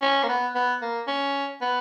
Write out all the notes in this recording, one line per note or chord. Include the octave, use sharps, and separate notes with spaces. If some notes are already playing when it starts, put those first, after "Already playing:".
C#4
A#3
B3
B3
A#3
C#4
B3